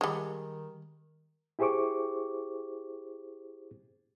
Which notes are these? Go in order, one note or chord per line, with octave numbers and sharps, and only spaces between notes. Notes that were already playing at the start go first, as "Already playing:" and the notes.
D#3 G3 G#3
E4 G4 G#4 C5 C#6 D6